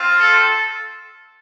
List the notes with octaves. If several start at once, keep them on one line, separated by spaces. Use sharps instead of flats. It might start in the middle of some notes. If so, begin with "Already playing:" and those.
Already playing: C4 F4
A4